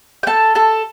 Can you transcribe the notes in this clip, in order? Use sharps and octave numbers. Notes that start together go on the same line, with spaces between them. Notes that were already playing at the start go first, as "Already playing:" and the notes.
G5
A4 A5
A4 A5